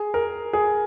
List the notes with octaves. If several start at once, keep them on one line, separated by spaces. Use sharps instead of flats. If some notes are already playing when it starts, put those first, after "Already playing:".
Already playing: G#4
A#4
G#4